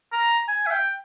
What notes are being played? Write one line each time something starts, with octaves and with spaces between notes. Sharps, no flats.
A#5
G#5
E5
G5